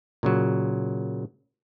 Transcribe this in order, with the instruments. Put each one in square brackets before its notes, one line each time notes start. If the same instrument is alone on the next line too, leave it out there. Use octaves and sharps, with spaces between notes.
[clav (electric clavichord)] A#2 C#3 F#3